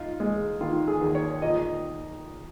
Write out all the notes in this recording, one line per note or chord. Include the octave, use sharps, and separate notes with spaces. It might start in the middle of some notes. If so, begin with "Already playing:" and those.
Already playing: D#4 F4
G#3
D#3 F4
G#4
D#2
C#5
A#2 D#5